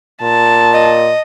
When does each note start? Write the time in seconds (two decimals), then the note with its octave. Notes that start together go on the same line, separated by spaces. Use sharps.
0.22 A#2 A5
0.74 D#5